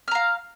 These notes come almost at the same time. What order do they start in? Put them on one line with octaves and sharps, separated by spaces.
F6 A#5 F5